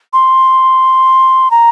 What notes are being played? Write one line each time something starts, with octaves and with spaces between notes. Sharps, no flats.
C6
A#5